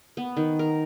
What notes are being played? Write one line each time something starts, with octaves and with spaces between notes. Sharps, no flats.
B3
D#3
A#4